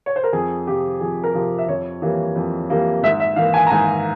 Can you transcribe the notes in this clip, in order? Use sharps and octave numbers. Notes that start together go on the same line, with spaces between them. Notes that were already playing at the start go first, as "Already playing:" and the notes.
C#5
C5
A#4
F2 G#4
C3 F3 G4
F2 G#4
A#4
C3 F3
E5
F2 C#5
E3 G3 A#3
F2
E3 G3 A#3
G#2 E5
E5
E3 A#3 F5
G#5
A#5
G#2 G#5